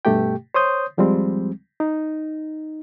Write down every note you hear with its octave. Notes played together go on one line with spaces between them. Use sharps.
G2 B2 A3 G4 G5
C5 C#5 C6 D#6 G6
D#2 F3 G3 G#3 C4
D#4